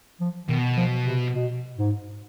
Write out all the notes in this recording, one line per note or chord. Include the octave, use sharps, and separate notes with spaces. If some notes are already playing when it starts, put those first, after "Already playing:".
F3
B2 D#3
F3
C3
B2
G#2